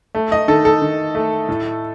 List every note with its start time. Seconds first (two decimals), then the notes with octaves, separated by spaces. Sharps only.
0.15 A3
0.32 D#5
0.48 D#3 A4
0.65 A4
0.82 D#3
1.15 A3
1.48 A2